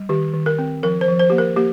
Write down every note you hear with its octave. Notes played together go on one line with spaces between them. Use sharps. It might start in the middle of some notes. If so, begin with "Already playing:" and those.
Already playing: G3
D#3 G4
D#3
A#4
C4
F3 A#4
C5
F3
C5
A#3 G4
A#4
A#3 G4